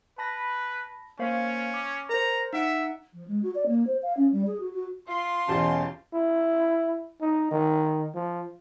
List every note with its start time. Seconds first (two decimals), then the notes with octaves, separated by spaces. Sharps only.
0.18 B4 A5 B5 A#6
1.19 A#3 C#4 C5 F5
1.74 D6
2.09 A#4 C5 A#5
2.53 D#4 E5 F#5 D7
3.14 F3
3.28 G#3
3.43 F#4
3.55 D5
3.67 A#3
3.87 C5
4.03 F5
4.17 C#4
4.32 G3
4.47 G#4
4.60 F#4
4.73 F#4
5.08 F4 C6
5.48 E2 B2 C#4 G4 A5
6.14 E4
7.21 D#4
7.51 D#3
8.15 F3